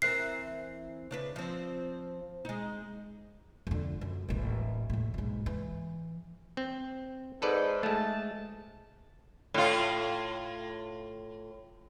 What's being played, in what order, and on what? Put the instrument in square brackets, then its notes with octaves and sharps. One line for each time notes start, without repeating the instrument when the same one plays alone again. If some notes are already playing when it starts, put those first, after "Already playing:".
[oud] E3 C4 A#4 [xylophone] F#6 C7
[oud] C#3 D4 B4
F3 C4
G#3 D#4
[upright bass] F2 D3
F#2
D#1 A1
E2 A2
B1 G#2
E3
[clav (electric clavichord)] C4
[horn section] G#2 [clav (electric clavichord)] A4 B4 D5
[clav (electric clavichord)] G#3 A3 [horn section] A5
[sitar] A2 F4